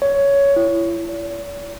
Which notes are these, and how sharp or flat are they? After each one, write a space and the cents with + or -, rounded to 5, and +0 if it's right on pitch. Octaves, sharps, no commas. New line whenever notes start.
C#5 +10
E4 +30
D5 -45